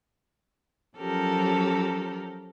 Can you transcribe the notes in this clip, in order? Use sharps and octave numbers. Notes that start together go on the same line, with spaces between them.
F3 F#3 C#4 G4 A4 A#4